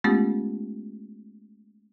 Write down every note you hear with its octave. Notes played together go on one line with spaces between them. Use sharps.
G#3 A3 B3 C#4 F4 G4